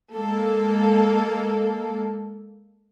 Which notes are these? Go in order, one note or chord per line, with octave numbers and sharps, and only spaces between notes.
G#3 A#3 A4